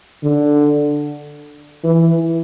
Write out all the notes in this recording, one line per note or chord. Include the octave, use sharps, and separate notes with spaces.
D3
E3